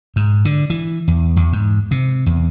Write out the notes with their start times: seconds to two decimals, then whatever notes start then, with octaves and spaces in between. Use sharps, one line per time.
0.16 G#2
0.45 D3
0.70 E3
1.08 E2
1.36 E2
1.53 G#2
1.91 C3
2.26 E2